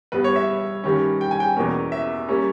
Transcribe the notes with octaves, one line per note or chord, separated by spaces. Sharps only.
G2 G3 B3 B4
C#5
E5
G2 D#3 G3 C#4
G5
G#5
G5
E2 B2 A#3 C#4
E5
G3 A#3 C#4